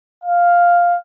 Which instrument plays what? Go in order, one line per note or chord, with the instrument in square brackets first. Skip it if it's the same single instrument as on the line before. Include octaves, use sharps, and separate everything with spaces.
[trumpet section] F5